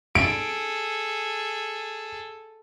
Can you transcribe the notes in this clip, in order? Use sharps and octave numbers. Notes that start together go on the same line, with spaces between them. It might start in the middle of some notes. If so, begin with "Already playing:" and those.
G#4 A4 D7